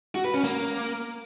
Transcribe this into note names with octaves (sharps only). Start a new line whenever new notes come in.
F#4
B4
C#4
A#3